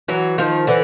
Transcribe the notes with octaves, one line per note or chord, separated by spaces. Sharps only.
E3 F#3
D#3 F3
D3 E3